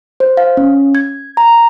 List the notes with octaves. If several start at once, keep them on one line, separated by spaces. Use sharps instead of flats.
C5
F5
C#4
G#6
A#5